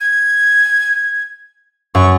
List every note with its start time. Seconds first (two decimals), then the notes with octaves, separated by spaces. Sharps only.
0.01 G#6
1.95 F#2 C#6